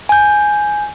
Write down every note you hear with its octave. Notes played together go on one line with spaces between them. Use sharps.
G#5 G6